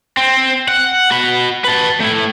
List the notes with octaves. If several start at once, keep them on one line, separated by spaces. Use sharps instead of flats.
C4
F#5
F#4 B5
B4 A5
A3 E4